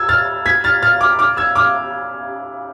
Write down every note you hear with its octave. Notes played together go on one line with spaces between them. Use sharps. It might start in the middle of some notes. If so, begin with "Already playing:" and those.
Already playing: E6 G#6
F6 A6
G#6 B6
F6 A6
F6 A6
D6 F6
D6 F6
E6 G#6
D6 F6